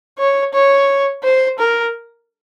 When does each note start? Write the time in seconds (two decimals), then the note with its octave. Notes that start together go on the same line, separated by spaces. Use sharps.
0.19 C#5
0.53 C#5
1.23 C5
1.58 A#4